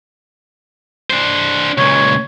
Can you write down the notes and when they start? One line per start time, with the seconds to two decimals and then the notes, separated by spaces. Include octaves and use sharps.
1.10 D4 C5
1.78 C#2 A#2 C#5